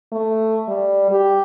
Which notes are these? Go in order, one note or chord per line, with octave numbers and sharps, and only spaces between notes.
A3
G3
G4